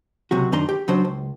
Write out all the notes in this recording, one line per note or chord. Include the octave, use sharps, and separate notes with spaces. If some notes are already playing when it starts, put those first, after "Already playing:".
C#2 C3 F#3 F#4
F#2 D#3 D4 A#5 C6
G4
C#2 C#3 F#3 D4 C5 D#5
C#2